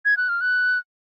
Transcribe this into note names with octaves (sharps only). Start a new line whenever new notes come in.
G#6
F#6
F6
F#6